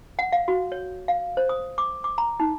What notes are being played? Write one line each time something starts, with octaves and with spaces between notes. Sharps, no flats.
F#5
F5
F#4
C#5
F5
C5
D#6
D6
D6
A#5
D#4